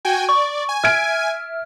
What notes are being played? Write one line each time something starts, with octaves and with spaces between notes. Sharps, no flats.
F#4 G5 G#5
D5 C#6
G#5
E5 F6 G#6 D7